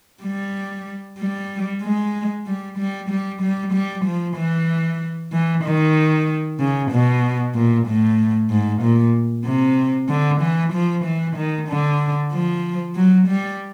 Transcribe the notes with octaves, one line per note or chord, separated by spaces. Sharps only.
G3
G3
G#3
G3
G3
G3
G3
G3
F3
E3
E3
D#3
C#3
B2
A#2
A2
G#2
A#2
C3
D3
E3
F3
E3
D#3
D3
F3
F#3
G3